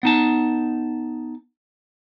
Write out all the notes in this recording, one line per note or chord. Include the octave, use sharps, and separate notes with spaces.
B3 D#4 A5